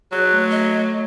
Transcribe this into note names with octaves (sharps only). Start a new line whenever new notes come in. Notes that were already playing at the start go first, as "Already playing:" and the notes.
F#3 G#4 F#6
A3
D#5